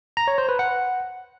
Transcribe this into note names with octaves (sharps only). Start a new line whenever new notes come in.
A#5
C#5
C5
B4
F#5